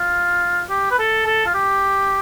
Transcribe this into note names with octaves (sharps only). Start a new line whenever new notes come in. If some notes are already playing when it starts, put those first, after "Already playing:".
Already playing: F4
G4
B4
A4
A4
F4
G4